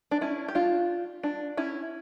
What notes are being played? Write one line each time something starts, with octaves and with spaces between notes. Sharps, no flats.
D4
C#4 E4
G4
D4 F4
D4
C#4 E4